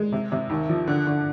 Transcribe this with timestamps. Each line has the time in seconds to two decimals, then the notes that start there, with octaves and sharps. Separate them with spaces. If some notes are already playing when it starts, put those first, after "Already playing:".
Already playing: G#3
0.12 C3
0.32 C3
0.50 D#2
0.69 F3
0.87 D3
1.07 D3